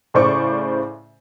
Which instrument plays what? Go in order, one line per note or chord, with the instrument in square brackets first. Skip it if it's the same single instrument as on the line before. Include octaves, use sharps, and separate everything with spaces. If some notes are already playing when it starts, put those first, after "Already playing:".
[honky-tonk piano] A2 C#3 C5 D5 C#6 D6